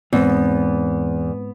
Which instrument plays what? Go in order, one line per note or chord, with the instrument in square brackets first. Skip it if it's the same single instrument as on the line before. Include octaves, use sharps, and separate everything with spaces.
[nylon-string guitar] E2 [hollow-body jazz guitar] G#2 B3 C4